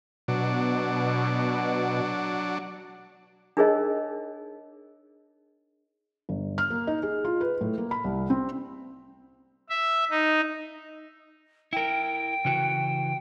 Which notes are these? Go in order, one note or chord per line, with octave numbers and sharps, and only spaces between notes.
B2 F#3 D4
D4 D#4 G#4 A#4 C#5 D#5
G1
F6
A#3
D#4
G#4
F4
B4
A2
A#3
B5
C2
C4
E5
D#4
E4 A#4 G5
C#3 E3 F#4